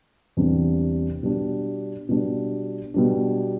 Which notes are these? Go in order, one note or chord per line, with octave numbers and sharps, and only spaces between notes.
E2 C3 G3 D4
B2 G3 D4
B2 G3 D4
B2 G3 D4